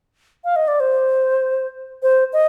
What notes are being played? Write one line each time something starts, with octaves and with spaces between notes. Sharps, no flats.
F5
D#5
D5
C5
C5
D#5